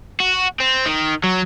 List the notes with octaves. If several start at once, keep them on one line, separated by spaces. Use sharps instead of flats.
F#4
C4
D#3
F#3